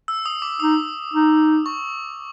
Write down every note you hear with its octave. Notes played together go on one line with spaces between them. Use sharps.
E6
D#6
D6
D#4 D#6
D#4
C#6